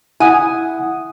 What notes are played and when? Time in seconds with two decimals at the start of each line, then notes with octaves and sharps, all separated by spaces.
0.20 E4 F#5 G#5 D#6